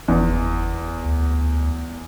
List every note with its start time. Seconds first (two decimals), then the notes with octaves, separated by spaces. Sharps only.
0.08 F#1 E2
1.04 D2